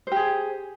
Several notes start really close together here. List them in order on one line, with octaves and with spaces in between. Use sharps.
C5 G4 G#4